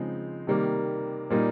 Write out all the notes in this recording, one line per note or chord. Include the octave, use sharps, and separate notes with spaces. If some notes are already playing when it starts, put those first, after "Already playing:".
Already playing: C#3 F3 G#3 C4 D#4
C3 D#3 G3 A#3
A#2 G3 A#3 D#4